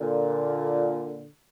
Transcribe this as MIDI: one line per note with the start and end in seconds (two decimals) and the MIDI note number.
0.01 1.28 46
0.01 1.28 50